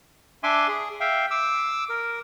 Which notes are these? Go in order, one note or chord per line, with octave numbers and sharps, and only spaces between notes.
D4 E5 G#5 C6 D6
G#4
E5 F5 G5
D6 E6
A#4